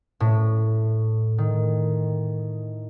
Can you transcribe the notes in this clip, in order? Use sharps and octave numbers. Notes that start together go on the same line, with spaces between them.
A2
D#3